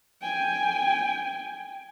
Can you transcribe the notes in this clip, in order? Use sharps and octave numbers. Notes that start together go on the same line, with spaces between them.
G5 G#5